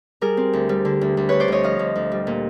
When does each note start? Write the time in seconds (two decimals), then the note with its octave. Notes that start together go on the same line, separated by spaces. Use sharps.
0.21 G3 G#4 A#4
0.37 C4
0.53 D2
0.69 G3
0.85 D3
1.01 D2
1.17 D2
1.29 D2 B4 C#5
1.40 C5 D5
1.48 D2 C#5 D#5
1.63 F3 D#5 F5
1.79 D2
1.95 D2
2.12 G3
2.27 A#2